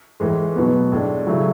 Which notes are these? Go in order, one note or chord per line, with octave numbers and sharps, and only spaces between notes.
A2 E3 G#3
B2 F#3 B3
A2 G#3 D4
C#3 F#3 A3 E4